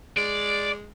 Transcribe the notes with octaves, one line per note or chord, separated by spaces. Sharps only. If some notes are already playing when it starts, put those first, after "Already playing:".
G#3 D5